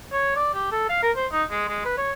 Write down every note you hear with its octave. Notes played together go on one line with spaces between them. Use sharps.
C#5
D5
G4
A4
F5
A#4
C5
D#4
G#3
G#3
B4
C#5